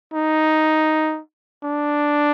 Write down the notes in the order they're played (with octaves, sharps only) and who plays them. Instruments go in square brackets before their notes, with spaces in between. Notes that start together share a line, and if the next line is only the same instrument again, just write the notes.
[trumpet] D#4
D4